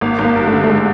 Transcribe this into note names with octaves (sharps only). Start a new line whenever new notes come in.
G#1 A#3
G#1
A#3
G2
D3 A3
A3
G#3